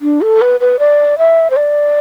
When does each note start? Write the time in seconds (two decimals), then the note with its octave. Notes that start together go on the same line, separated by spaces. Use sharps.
0.02 D4
0.21 A4
0.41 B4
0.60 B4
0.79 D5
1.18 E5
1.50 C5
1.56 D5